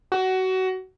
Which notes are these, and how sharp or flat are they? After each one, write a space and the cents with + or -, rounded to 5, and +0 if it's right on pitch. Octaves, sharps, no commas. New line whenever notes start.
F#4 +20